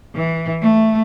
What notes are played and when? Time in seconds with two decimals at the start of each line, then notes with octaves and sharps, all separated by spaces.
0.14 E3
0.61 A3